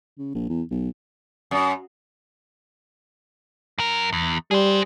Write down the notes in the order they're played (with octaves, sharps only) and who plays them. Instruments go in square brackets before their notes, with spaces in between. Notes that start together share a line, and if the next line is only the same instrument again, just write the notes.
[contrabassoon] C#3
A#1
E2
B1
[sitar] F#2
[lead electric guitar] F#2 A#4
E2
[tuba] G3 [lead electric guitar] G#4 C5